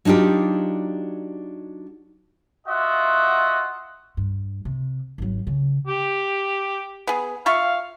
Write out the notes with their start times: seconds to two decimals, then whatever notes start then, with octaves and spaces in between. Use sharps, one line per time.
0.05 F#3 D4 D#4 F4 G4
2.67 F4 F#4 D#5 E5 F#5
4.17 G2
4.65 C3
5.18 G#1 F#3
5.47 C#3
5.87 G4
7.07 B3 G#4
7.46 F4 E5 F5 C#6